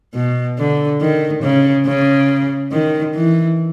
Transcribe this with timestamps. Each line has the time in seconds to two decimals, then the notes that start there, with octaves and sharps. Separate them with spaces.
0.14 B2
0.58 D3
1.01 D#3
1.43 C#3
1.86 C#3
2.72 D#3
3.15 E3